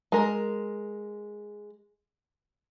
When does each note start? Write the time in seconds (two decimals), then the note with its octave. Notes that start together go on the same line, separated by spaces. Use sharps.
0.12 G#3 A#4